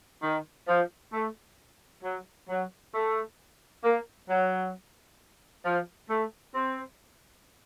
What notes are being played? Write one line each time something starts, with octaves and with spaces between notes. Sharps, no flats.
D#3
F3
A3
F#3
F#3
A3
A#3
F#3
F3
A3
C4